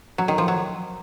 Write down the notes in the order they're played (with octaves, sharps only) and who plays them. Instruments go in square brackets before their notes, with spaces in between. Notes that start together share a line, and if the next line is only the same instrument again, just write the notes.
[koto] F#3
D#3
F3
F#3